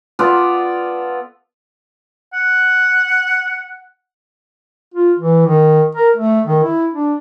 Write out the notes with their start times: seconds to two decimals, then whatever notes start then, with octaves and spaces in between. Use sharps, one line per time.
0.19 B3 F4 A4 D5
2.34 F#5
4.94 F4
5.19 E3
5.46 D#3
5.95 A#4
6.16 A3
6.46 D#3
6.63 E4
6.93 D4